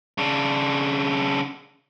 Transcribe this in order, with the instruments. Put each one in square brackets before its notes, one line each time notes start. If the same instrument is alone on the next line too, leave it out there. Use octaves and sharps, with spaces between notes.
[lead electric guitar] C#3 D4